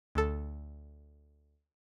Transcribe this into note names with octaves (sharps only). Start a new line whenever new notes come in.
D2 A4